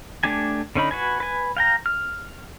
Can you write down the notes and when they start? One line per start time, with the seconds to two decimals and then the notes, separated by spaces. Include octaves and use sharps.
0.23 A3 D4 G4 G#5
0.75 D3 C#4 D#4 B5
0.91 F#4 B4 G#5
1.20 B4 G#5
1.57 F5 G5 A#5
1.86 F6